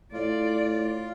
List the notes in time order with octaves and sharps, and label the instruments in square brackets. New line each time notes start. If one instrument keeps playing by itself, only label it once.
[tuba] A2 [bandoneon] F4 [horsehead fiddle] D5